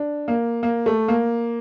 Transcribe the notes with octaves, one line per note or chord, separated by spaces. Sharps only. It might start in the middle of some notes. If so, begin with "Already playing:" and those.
Already playing: D4
A#3
A#3
A3
A#3